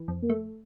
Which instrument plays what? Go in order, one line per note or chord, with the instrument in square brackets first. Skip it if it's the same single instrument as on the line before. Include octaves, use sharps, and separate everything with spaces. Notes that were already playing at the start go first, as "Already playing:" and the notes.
Already playing: [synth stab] E3
F2
[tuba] A#3
[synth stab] A3